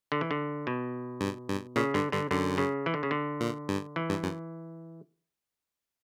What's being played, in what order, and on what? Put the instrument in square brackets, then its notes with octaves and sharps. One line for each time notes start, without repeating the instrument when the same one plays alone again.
[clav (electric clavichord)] D3
E3
D3
B2
[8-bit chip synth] G2
G2
[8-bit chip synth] A#2 [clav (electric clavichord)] C#3
[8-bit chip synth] G2 [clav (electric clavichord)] D3
[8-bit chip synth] G2 [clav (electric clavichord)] D3
[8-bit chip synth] F#2 [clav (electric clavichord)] D3
[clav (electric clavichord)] C#3
E3
D3
C#3
D3
[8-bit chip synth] A#2
G2
[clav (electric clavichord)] E3
[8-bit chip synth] G2
F#2